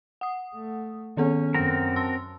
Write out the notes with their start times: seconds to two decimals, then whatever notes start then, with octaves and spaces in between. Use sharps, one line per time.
0.21 F#5 D#6
0.55 A3
1.17 D#3 B3 C#4 A4
1.54 F#2 C4 F#4 A#4
1.96 A5 C6 E6